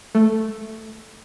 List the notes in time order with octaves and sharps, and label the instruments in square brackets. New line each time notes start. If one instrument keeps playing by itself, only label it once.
[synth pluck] A3